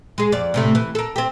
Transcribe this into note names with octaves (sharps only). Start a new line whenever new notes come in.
G#3 G#4
F2 D5
A2 C3 A3
E3
A4 A#4
C4 G4